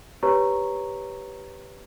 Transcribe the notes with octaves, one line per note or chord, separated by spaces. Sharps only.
G4 B4 C#5 A#5 C#6